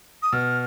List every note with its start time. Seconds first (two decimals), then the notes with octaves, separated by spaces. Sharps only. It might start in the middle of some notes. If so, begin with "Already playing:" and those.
0.22 D#6
0.33 B2 F6